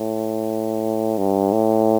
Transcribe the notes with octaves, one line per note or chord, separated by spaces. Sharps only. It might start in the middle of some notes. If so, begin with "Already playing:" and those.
Already playing: A2
G2
A2